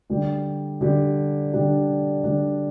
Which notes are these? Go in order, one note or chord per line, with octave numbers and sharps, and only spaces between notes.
D3 G3 D4 G4
D3 G3 D4 G4
D3 G3 D4 G4
D3 G3 D4 G4